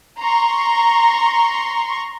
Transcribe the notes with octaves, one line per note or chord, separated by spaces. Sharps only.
A#5 C6 C#6